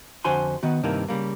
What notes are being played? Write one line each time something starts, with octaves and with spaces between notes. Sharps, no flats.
F2 D3 F#4 C5 G#5 C6
D#3 B3 F#4
G2 C3 D#3 A#3 E4
C#3 G3 A#3